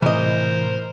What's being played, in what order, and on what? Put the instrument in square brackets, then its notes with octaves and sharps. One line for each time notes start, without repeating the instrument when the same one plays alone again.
[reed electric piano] A2 C3 [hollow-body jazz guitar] E3 D#5 [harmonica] A#4 C5